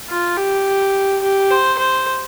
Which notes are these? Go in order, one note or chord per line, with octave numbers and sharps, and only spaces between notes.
F4
G4
G4
C5
C5